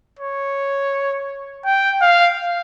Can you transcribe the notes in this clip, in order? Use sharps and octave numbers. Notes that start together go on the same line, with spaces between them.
C#5
G5
F5